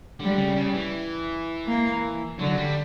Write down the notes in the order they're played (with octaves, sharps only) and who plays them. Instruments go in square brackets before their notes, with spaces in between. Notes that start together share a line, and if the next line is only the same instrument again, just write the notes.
[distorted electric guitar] D3 [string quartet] G3
[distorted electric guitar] C#3
C#3
E3
[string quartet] A#3
[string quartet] D3 [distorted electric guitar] F#3
[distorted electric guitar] G3